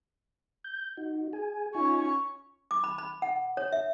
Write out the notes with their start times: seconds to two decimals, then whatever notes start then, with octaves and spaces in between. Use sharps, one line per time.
0.64 G6
0.97 D#4 F#4
1.33 G#4 G#5
1.75 C#4 D#4 F4 G#5 C#6
2.71 D6
2.84 B5
2.98 B5
3.22 F#5
3.57 C#5
3.72 E5